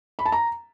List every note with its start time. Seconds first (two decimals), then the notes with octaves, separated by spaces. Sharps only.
0.19 B5
0.26 A5
0.32 A#5